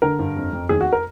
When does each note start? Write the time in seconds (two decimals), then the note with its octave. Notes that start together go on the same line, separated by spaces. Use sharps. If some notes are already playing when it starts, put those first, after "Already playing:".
0.02 D3 A#4
0.19 G2
0.37 F2
0.53 F2
0.69 D#2 G#4
0.81 F#4
0.93 A#4